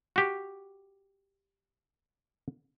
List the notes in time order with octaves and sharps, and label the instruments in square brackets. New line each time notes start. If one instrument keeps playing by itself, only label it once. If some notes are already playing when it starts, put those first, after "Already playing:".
[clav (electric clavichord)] F#4 G4